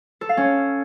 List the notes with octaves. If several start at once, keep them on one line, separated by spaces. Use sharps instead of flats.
A4
F5
C#4